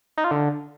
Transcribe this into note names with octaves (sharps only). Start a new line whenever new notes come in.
D#4
F4
D3